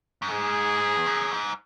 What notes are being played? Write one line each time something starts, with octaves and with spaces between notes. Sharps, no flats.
F#2
G#2 G#4
E2
F#2
G#2